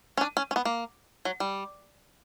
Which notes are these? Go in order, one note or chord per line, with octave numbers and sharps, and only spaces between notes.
C#4
D4
C#4
C#4
B3
A#3
F#3
G3